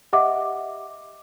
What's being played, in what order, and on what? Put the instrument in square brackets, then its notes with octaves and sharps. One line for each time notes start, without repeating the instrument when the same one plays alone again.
[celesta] G4 D#5 E5 F#5 D6